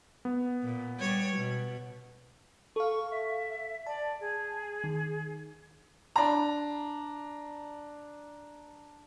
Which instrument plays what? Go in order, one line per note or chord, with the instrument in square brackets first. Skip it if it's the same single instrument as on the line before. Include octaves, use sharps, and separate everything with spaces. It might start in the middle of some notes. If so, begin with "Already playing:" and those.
[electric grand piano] B3
[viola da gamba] A#2
G3 C#5
B2
[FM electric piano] A4 F5 [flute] C#6
[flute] E5
[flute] D5 [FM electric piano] A5
[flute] G#4
[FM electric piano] D#3
[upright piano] D4 A#5